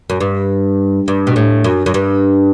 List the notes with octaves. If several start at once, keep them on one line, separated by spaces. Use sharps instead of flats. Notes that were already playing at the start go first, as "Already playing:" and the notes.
F#2
G2
G2
B2
A2
F#2
F#2
G2